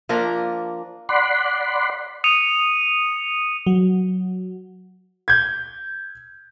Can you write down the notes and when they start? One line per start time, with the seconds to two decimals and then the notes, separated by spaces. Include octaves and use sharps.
0.09 F3 A#3 D4 A#4
1.09 D5 F#5 B5 C6
2.24 D#6 C#7 D#7 F7
3.67 F#3
5.28 G6 G#6